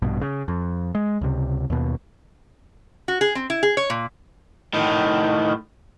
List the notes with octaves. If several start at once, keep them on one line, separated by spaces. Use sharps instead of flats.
A#1 G2 B2
C#3
F2
G#3
C#2 C3
D#2 B2
F#4
G#4
C4
E4
G#4
C#5
A#2
A2 D#3